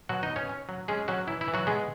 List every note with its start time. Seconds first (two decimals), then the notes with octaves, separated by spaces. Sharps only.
0.09 B2 F#3 F#4
0.23 D#4 D#5
0.30 B2
0.36 C#4 C#5
0.49 C#4
0.69 F#3
0.88 G#3 C#4 G#4
1.08 F#3 C#4 F#4
1.27 E3 E4
1.41 E4
1.48 E3
1.54 F#3 F#4
1.67 G#3 B3 G#4